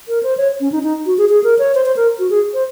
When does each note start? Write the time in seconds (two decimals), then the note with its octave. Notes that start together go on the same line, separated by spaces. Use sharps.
0.08 A#4
0.23 C5
0.38 C#5
0.60 C#4
0.72 D#4
0.83 D#4
1.06 F#4
1.18 G#4
1.29 G#4
1.44 A#4
1.59 C#5
1.75 C5
1.86 C5
1.97 A#4
2.19 F#4
2.31 G#4
2.54 C5